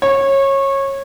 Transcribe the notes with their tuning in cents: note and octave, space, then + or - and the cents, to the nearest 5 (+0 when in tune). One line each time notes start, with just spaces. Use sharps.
C#5 -20